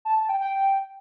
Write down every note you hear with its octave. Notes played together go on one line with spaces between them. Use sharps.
A5
A5
G5
G5